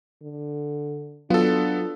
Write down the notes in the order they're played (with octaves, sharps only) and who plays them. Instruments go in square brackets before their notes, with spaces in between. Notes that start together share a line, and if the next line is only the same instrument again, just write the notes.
[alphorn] D3
[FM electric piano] F#3 F4 [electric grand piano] B3 A4 [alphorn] D4